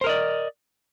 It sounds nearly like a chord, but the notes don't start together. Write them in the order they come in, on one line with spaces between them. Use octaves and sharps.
C5 A#4 D#5 D5